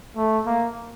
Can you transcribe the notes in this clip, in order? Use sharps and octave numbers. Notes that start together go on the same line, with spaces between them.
A3
A#3